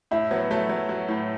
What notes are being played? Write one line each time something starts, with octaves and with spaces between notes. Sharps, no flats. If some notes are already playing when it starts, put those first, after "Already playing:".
A2 E4
F#3 B3
F#3 A3
F#3
F#3
A2